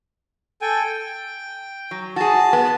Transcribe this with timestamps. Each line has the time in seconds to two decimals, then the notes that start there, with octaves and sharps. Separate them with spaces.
0.62 A4 G5 G#5
0.84 G5
1.91 F#3
2.16 F#4 G#4 A5
2.53 B3